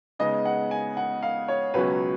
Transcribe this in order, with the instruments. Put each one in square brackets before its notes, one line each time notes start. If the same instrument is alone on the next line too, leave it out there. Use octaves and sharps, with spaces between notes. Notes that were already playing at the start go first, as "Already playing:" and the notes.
[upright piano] C#3 G#3 B3 D#4 D#5
F#5
G#5
F#5
F5
C#5
C#2 B2 F#3 C#4 B4